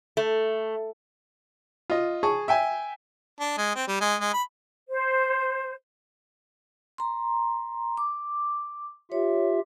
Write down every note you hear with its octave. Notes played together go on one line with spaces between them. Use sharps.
A3
F4 D#5
G#4 A5 C#6
E5 G5 G#5
D4
G#3
C4
G3
G#3
G#3
B5
C5
A#5 C6
D6
F4 G4 C#5 E5